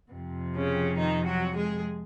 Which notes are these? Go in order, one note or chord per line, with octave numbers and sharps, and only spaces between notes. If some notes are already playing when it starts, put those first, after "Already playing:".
F2 C3 F3
C#3 C#4
D#3 D#4
F#3 F#4
G#3 G#4